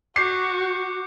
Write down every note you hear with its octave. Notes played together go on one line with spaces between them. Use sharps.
F#4 C#6 D6 G6 C7 C#7